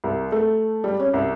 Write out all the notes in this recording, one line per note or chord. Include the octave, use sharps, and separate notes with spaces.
C2
A3
G3
C#4
C2